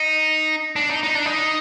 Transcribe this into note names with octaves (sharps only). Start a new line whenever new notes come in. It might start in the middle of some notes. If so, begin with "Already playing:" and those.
Already playing: D#4
D4
D#4
D#4
D4
D#4